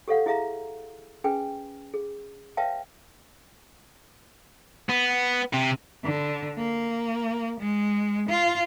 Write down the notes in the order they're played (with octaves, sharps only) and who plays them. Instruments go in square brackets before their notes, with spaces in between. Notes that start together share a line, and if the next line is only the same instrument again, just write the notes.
[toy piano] G4 A4 C#5 F5 F#5
E4 G#4 E5 F5 A#5
C#4 G#4 B4 G5 G#5
G#4
B4 C#5 E5 F5 G5 A5
[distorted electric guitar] B3
C3
[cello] D3
A#3
G#3
F4